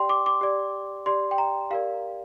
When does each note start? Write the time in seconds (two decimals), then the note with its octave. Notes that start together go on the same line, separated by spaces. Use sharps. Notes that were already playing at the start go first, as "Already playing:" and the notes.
Already playing: G4 D5 G5 C6
0.09 D6
0.26 D6
0.41 G4 D5
1.06 G4 D5 C6
1.31 G5
1.38 A#5
1.71 G4 A#4 D5 F5